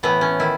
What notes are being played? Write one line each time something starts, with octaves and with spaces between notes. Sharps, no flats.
A2 E3 A3 B3
C#4
D#3 E4